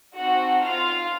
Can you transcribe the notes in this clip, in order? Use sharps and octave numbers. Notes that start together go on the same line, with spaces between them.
C4 D#4 F#4 A4 F#5
F4 F5